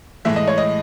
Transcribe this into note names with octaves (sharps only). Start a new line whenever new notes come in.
A2 E3 G#3 E5
D#5
C#5
D#5